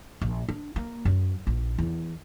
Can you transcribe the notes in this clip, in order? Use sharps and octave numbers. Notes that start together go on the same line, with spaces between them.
A#1
D4
A#3
F#2
A#1
E2